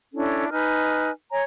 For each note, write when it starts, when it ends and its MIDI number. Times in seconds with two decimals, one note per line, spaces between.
0.14 0.49 61
0.14 0.49 62
0.14 0.49 64
0.14 0.49 69
0.51 1.10 63
0.51 1.10 71
0.51 1.10 80
0.51 1.10 89
1.31 1.42 73
1.31 1.42 80
1.31 1.42 82